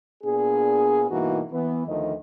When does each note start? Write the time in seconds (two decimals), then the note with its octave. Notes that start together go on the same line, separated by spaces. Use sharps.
0.23 A#2 B3 D4 G#4
1.10 G2 B2 E3 A#3 D#4 F#4
1.52 E3 B3
1.87 D2 D3 D#3 F3 A3 D#5